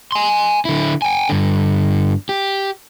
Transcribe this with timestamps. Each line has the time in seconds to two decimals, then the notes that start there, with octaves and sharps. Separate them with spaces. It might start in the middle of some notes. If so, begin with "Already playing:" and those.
0.12 G#5 C6
0.65 D3 E4
1.02 G5 G#5
1.29 G2 D3
2.29 G4